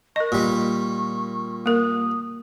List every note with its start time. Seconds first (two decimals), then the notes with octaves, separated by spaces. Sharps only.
0.16 A#4 D#5 C#6
0.32 A#2 G3
1.66 A#3 A#4 D#6